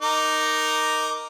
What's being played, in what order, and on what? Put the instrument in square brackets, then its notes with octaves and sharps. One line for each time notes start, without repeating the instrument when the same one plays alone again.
[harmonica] D#4 A#4 D6